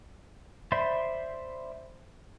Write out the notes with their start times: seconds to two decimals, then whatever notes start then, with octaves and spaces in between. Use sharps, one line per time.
0.72 C5 D5 E5 B5 C6